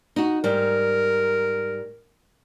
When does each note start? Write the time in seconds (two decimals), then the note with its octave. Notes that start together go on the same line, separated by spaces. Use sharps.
0.16 D#4 F#4
0.44 G#2 G3 A#4